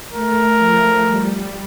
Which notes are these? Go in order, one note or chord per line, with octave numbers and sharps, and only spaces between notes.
A3 A#4
F3
G3